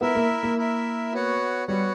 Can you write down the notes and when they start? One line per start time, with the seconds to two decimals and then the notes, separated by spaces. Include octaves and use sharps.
0.01 B3 E4 A#4 E5
0.15 A#3
0.43 A#3
0.57 E4 A#4 E5
1.12 B3 F#4 C#5 F#5
1.68 G3 B3 F#4 C#5 F#5